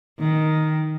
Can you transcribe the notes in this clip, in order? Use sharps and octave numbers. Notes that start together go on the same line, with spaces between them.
D#3